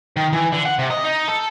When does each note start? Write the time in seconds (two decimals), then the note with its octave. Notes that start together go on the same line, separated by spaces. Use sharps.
0.16 D#3
0.33 E3
0.53 D3
0.66 F#5
0.79 C3
0.91 D#5
1.04 D#4
1.28 A4